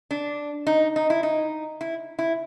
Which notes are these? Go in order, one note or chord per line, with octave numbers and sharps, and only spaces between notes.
D4
D#4
D#4
E4
D#4
E4
E4